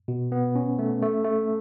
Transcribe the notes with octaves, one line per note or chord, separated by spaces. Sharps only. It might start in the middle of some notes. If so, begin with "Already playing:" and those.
B2
B3
C#4
A3
A3
A3